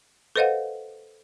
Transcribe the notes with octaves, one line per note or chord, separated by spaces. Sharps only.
A4 B4 C5 D#5 F5 F#5